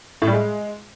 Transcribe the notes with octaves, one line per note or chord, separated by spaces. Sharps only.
A2
G3
G#3